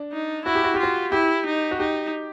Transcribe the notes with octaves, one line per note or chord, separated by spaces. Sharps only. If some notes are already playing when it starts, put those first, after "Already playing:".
Already playing: D4
D#4
E4 F#4
G4
F#4
G4
F4 F#4
E4 G4
D#4
F#4
D#4 G4